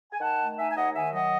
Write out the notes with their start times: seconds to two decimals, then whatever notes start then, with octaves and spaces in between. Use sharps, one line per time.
0.13 G#5
0.20 D#3 F#5 A5
0.39 A3
0.58 D#4 E5 G#5
0.70 G#5
0.76 D#2 D#5 F#5
0.95 D#3 E5 G#5
1.13 F#3 D#5 F#5